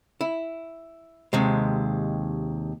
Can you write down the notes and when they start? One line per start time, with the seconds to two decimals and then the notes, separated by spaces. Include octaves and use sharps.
0.21 E4
1.33 D#2 C3 G#3